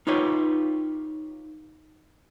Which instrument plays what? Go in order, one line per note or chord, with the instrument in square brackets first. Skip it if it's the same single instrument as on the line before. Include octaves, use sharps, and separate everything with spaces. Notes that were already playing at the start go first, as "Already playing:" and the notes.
[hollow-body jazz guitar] D#4 F4 G4 B4 C#5